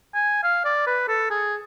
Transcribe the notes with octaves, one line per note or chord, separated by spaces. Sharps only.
G#5
F5
D5
B4
A4
G#4